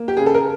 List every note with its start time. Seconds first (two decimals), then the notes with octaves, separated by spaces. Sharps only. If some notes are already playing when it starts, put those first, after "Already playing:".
Already playing: A#3
0.08 G4
0.17 C#3 G#4
0.26 A4
0.34 A#4